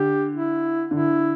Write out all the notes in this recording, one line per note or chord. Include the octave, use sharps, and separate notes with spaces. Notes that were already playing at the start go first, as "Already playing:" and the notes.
Already playing: D3 G4
E4
D3 E4